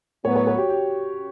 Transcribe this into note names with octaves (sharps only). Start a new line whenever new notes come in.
A2 F#3 B3 C#5
C#5
C#5
F#4
G4
G4